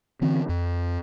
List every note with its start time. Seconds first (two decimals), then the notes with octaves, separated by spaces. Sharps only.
0.22 D3 E3 C4
0.49 F2